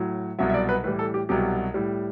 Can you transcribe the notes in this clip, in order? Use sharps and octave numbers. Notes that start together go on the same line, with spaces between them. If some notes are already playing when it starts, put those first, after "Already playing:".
Already playing: A2 F#3
C2 B2 F#3 E5
E5
D5
B4
A2 E3 G3 B4
A4
G4
C2 B2 F#3 G4
A2 G3